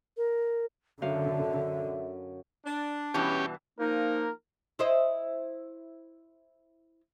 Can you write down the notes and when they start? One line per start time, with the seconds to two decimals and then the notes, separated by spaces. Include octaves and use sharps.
0.17 A#4
1.02 F#2 D3 E5 F5
2.66 D4
3.14 G2 B2 E3 C#4 G4
3.79 F3 A#3 D#4 A#4
4.79 E4 C5 D#5